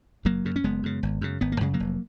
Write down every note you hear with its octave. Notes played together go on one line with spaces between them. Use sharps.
F#1 F#3 A#3
F#2 C#3
C#4
F#1 G#3 B3
F#2 C#3
G#1
F#2 C#3
G#1 B3
A#3
F#2 C#3 G#3
F#3 A#3
F1